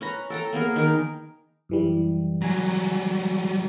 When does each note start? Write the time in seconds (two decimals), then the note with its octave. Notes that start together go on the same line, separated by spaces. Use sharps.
0.01 C#4 B4 A#5
0.30 A4 G5 A#5
0.53 A#3 B3 G#4 A#4
0.76 D#3 D#4 A#4
1.69 F#2 E3 G3
2.42 F#3 G3 G#5 A#5